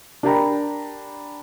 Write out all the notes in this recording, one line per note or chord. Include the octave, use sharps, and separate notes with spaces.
D4 G4 A#4 G5 A#5 B5